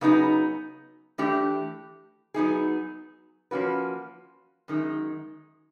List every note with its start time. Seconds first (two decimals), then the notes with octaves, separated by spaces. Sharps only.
0.01 C#3 F#3 B3 D#4 G#4
1.18 E3 A3 D4 G4
2.34 F#3 B3 D#4 G#4
3.51 F3 A#3 C#4 F#4 B4
4.68 F#2 D#3 G#3